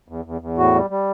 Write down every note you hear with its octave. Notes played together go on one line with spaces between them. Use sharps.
E2
E2
E2
A2 F#4
G3
G3